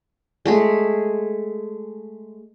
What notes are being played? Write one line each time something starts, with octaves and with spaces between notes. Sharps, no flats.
G#3 A3 G#4